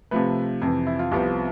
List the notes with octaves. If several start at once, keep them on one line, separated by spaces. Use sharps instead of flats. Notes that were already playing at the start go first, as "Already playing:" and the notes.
C3 F3 A3 B4
F2 C3 E3
E4
F4
C2 C3 F3 B3 G4